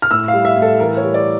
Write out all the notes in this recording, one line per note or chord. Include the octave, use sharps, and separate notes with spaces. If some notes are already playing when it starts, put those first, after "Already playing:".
F6
A2 E6
F5
G3
E5
A2
A4
E3 A#4
C#5
G3
D5